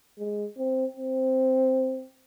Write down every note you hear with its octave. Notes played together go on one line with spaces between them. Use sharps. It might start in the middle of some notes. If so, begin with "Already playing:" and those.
G#3
C4
C4